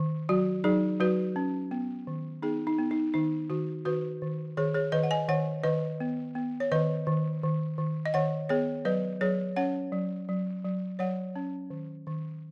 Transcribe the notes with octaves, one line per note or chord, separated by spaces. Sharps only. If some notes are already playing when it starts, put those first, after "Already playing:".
Already playing: D#3
F#3 F#4
F#3 D#4 G#4
F#3 F#4 B4
C#4
B3
D#3
B3 D#4 G#4
D#4
B3
D#4
D#3 D#4
D#3 F#4
D#3 F#4 B4
D#3
D#3 G#4 C#5
G#4 C#5
D#3 B4 D#5
F#5
D#5 G#5
D#3 C#5 F#5
D#3 B4 D#5
B3
B3
C#5
D#3 B4 D#5
D#3
D#3
D#3
D#5
D#3 C#5 F#5
B3 G#4 C#5
F#3 B4 D#5
F#3 G#4 C#5
C#4 C#5 F#5
F#3
F#3
F#3
F#3 C#5 F#5
C#4
D#3
D#3